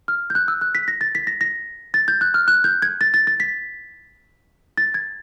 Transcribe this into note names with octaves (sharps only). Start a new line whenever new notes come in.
F6
G6
F#6
E6
F#6
B6
A#6
A6
B6
A#6
A#6
A6
G6
F#6
F6
F#6
G6
G#6
A6
A6
A6
B6
A6
G#6